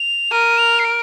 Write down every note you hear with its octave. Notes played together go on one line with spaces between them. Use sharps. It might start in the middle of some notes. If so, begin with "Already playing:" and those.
Already playing: F7
A#4 D#7
F7
C7
D7